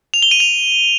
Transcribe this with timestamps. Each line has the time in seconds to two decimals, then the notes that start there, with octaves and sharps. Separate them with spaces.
0.14 F7
0.22 G7
0.31 D#7
0.40 F7